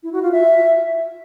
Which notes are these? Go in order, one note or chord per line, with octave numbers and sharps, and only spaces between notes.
E4
F#4
F4
E5